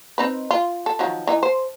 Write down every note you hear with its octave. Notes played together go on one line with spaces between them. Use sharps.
C4 D#4 B4
F4
A4
D#3 F3 F#3
E3 D#4
C5